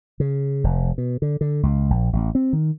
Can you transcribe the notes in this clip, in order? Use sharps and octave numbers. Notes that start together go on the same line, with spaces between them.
C#3
F1
B2
D3
D3
C#2
A#1
A1
C4
D#3